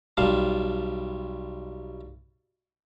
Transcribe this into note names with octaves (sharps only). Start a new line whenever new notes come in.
B1 G3 F5 A5